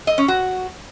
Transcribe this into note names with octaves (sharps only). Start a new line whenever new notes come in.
D#5
C#4
F#4